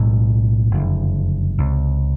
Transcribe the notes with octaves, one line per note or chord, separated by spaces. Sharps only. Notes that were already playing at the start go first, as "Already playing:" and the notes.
Already playing: B1 A2 G#3
F#1 F2 D3
C#2 C3